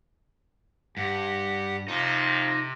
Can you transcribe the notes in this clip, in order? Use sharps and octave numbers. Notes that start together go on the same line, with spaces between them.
G2 G4 F#5
F2 C3 D#4